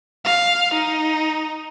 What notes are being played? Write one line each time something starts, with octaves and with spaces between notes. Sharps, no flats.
F5
D#4